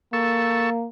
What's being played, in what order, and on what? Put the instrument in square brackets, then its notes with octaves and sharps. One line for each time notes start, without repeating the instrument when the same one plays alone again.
[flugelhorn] A#3 [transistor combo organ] A4 C#6 E6